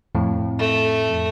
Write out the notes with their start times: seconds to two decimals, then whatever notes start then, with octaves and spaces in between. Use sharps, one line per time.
0.15 F2 A2
0.59 A3